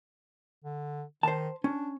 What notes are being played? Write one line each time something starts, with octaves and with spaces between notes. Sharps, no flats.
D3
D#3 C5 A5
C#4 D4